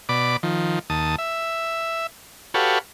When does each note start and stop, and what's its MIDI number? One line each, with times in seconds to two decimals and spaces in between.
0.09 0.37 47
0.09 0.37 74
0.09 0.37 83
0.09 0.37 86
0.43 0.79 51
0.43 0.79 53
0.90 1.16 39
0.90 1.16 81
0.90 1.16 87
1.18 2.07 76
2.54 2.79 66
2.54 2.79 67
2.54 2.79 69
2.54 2.79 71
2.54 2.79 73
2.54 2.79 77